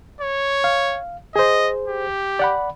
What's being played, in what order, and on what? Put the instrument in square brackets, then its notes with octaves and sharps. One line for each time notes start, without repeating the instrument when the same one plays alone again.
[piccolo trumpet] C#5
[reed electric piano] F5
[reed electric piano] G#4 C5 [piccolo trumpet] D#5
[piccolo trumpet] G4
[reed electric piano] D5 F#5 B5